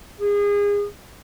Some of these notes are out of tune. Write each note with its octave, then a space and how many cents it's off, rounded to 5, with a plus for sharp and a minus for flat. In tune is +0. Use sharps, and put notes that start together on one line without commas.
G#4 -30